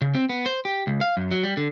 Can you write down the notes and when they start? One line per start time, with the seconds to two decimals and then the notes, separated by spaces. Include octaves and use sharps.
0.01 C#3
0.15 C4
0.29 B3
0.46 C5
0.65 G4
0.87 C#2
1.01 F5
1.17 F#2
1.31 F#3
1.43 G3
1.57 D3